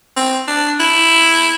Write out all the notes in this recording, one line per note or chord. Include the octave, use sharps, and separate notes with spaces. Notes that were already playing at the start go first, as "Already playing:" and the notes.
C4
D4
E4